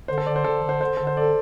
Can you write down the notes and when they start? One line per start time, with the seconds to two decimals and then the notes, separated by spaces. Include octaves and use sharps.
0.08 D3 C5
0.18 A4
0.26 D3 D5
0.36 C5
0.44 D3 A4
0.63 D3
0.69 C5
0.81 D3 C5
0.97 D3 A4
1.07 C5
1.17 A4 D5